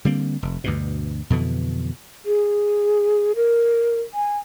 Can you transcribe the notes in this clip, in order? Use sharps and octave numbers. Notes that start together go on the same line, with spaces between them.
D3 G3 A#3 C4
F1
D2 G2 B2
F2 B2 D3 E3
G#4
A#4
G#5